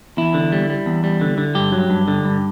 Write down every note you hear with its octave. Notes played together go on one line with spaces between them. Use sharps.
E2 E4
D3
G3
G3
E2
G3
D3
D3
G2 G4
F#3
G2
D3
G2